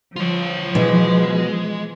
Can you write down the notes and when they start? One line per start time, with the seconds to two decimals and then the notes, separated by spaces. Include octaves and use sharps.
0.16 F3 F4 C#5
0.75 B2 E3 G#3 B3